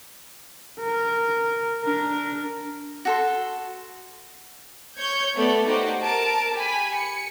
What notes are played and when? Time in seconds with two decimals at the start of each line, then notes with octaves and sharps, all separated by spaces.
0.80 A#4
1.84 D4 A#4
3.05 F#4 A4 C6
4.98 C#5 C#6 G6 G#6
5.35 A3 B3 A4 D5
5.66 D#4 F#4 G4 C5
6.00 A#4 A5 D7
6.53 G4 G#5 B5
6.94 C#7